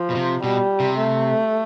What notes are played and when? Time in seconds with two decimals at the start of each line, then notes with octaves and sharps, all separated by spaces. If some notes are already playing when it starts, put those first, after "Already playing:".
Already playing: F3
0.10 B2
0.15 C3
0.44 B2 G3
0.80 C3
0.97 A3